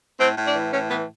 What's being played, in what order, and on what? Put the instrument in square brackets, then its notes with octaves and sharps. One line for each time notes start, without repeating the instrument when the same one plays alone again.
[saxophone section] A2 C4
A2
D4
E3
A2 C#4
E3 B3